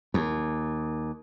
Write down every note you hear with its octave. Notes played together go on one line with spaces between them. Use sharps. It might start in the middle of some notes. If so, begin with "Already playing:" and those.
D#2